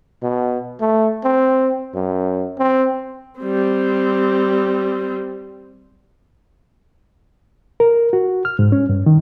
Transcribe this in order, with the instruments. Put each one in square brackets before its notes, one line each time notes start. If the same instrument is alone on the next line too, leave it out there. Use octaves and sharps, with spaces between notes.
[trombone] B2
A3
C4
F#2
C4
[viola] G3 C4
[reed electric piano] A#4
F#4
F6
G#2
C#4
G2
D#3